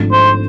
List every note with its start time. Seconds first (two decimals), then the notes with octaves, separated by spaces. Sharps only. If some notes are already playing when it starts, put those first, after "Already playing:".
Already playing: G#1 G#2 F3 A3 D4
0.12 C5